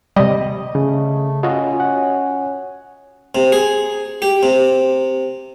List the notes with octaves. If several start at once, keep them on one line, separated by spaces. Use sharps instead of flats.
C3 G3 D#5
C#3 A3
C#4 F4 F#4 D#5
F#5
C3
G#4
G4
C3